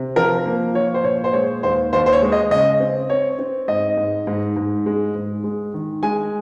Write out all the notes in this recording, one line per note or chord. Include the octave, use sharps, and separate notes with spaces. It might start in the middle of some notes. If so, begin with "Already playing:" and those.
Already playing: C3
F3 A#4
A#3
F3 C#5
C5
A#2 C#5
C5
G#3 C#5
D#2 C5
D#2 C5
C5
C#5
G#3
D#5
C#3 D#5
C4
C4 C#5
C4
G#2 D#5
G#2
G#2
G#2
G#3
G#2
G#3
D#3
G#3 G#5